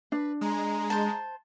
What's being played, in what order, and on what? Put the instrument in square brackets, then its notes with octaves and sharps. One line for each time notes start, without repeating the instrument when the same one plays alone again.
[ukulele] D4 [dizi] B4
[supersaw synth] G#3 [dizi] A#5
[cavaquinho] C5 A5